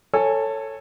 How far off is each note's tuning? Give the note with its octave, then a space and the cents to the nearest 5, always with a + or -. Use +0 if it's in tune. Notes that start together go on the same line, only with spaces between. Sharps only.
A4 +15 C#5 -5 G#5 +0